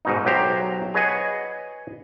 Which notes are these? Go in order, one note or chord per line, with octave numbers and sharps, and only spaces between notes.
G#2 B2 D#4
B1 F#3 G4 C5 A#5
G#4 B4 C#5 D#5 F#5 G#5